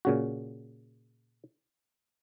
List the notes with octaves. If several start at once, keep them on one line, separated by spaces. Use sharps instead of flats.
A#2 C#3 F#4